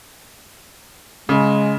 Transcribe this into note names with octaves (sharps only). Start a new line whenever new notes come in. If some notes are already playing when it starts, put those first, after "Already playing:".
C#3 G#3